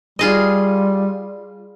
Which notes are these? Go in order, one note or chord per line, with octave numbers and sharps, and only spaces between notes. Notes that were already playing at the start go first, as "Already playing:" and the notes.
G3 F4 G#4 D#5